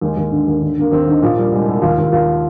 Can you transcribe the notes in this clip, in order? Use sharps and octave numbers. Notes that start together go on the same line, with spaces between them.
D#2 G#3
D#2
D3
D#2
D3
D3 A#3
D#2 C4
D3 D#4
A#2 F3
A#2 G3
C2 G#3
C2
D#2 F4
D#2
D#2 F4